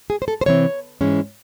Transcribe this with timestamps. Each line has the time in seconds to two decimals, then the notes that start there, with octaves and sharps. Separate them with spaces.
0.10 G#4
0.22 C5
0.28 A4
0.41 C5
0.46 C3 E3 C4 C#5
1.01 G#2 E3 G#3 C#4